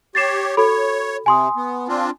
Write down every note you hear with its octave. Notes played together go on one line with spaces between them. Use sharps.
G4 C#5 A6 C7 E7
F#4 A4 C#5 B5
C3 G#5 C6 D#6
B3
C4 D4 F4